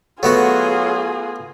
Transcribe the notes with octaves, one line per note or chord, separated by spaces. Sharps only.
F#3 A3 B3 F4 F#4 G#4